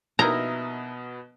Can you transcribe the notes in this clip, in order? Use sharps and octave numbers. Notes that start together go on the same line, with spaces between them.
B2 B3 D#4 E4 A#4 A#5